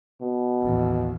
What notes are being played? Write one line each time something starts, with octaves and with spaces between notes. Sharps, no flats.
B2
A1 D#2